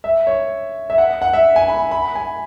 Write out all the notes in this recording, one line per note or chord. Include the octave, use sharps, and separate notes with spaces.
E5
C#5
E5
F#5
F#5
E5
G#5
B5
B5
G#5